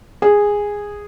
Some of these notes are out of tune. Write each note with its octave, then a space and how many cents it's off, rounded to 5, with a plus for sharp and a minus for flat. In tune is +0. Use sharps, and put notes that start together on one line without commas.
G#4 -10